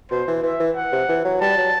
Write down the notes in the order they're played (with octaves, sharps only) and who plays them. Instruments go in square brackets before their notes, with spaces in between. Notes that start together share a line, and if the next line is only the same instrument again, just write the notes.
[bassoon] B2 [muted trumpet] C5
[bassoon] E3
[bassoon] E3 [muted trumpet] E5
[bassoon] E3
[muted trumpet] F#5
[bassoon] C3
E3
F#3
[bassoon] G3 [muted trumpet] A5
[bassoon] F#3